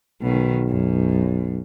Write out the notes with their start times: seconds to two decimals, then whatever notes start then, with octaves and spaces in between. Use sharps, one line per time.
0.22 B1 B2 D#3
0.68 F#2